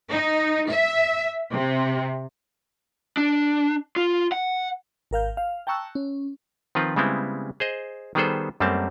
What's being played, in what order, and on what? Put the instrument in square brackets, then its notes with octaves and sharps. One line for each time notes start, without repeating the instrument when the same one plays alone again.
[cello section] D#4
E5
C3
[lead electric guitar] D4
F4
F#5
[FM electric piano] G#1 A#4 F5 G6
F5
G5 A5 A#5 C#6 E6 F#6
C#4
[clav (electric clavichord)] D#3 F3 C4 F4 B4
C#3 G3 G#3 B3 C4 E4
G#4 C5 D#5
D#3 G3 B3 G#4 A4 C5
F#2 G3 A3 A#3 C4 A5